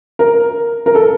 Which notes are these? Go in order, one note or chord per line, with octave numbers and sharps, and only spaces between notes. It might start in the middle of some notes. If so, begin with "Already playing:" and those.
A#4
A#4
A4